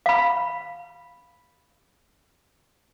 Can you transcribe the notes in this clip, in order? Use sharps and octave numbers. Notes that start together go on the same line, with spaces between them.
F5 B5